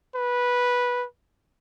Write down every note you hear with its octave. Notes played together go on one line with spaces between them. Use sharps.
B4